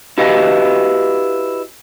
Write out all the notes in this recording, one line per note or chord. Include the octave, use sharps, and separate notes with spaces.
E4 F#4 G4 B4 D#5 F5